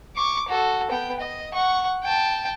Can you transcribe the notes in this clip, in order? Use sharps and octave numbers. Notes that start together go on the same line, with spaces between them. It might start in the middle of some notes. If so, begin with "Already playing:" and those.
C#6 D6
F#4 A4
B3 G5
D#5
F#5 C#6
G5 A5